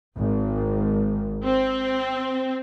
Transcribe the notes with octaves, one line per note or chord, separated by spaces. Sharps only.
G#1
C4